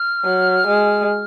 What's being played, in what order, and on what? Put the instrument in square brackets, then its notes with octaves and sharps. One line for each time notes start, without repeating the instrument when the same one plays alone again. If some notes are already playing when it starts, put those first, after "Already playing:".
Already playing: [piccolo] F6
[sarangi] F#3
G#3